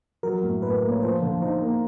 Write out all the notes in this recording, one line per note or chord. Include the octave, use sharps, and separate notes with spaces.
F#3 A#4
A2
A2 B4
A#3
C#5
F3 C5
D3
D#4 C5
A#3